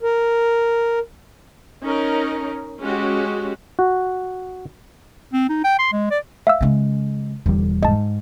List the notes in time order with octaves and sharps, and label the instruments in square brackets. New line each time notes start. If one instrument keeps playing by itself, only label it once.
[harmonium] A#4
[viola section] C#4 D#4 A#4
G#3 C#4 F#4 G4
[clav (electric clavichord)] F#4
[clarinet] C4
D#4
G5
C6
G#3
D5
[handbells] E5 F5 E6
[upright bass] C#3 G#3
[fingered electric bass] E1 E2 G3 [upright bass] D3
[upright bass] G#2 [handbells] D#5 A5